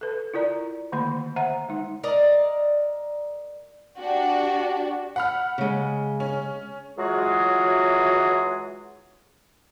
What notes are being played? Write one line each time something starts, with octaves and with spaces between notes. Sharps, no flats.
A4 B4
E4 F4 A#4 D5 A#5
D3 D#3 A3 A#3 B5
C5 E5 F#5 A#5
G#3 D#4
A#4 D5 D#5
D4 F#4 G4
F#5 B5 F6
C#3 G#3
C#4
E3 F#3 G#3 F4 F#4 G#4